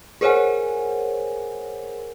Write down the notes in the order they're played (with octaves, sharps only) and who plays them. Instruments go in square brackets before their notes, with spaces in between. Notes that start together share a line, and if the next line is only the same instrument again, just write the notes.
[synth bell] G#4 A#4 C5 C#5 F#5 G#5